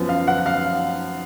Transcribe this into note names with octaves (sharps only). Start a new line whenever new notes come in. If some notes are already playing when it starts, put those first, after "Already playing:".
Already playing: F#2 F3 B3
F5
F#5
F5